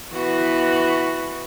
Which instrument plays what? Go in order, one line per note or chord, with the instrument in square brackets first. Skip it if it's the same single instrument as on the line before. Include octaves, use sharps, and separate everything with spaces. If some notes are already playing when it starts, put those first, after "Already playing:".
[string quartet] E3 B3 F#4